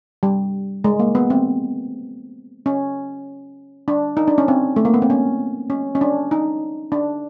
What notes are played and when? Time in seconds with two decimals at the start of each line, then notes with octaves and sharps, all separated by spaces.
0.23 G3
0.84 G#3
0.99 A#3
1.15 B3
1.30 C4
2.66 C#4
3.88 D4
4.17 D#4
4.28 D4
4.38 C#4
4.48 C4
4.76 A3
4.85 A#3
4.94 B3
5.02 C4
5.10 C#4
5.70 C#4
5.95 C#4
6.01 D4
6.31 D#4
6.92 D4